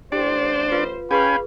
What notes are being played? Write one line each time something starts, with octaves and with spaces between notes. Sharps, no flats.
A1 D4 G4 C5 D5 G5
F4 B4 F5
C#4 G#4 B4 F5 G5 G#5 B5 C#6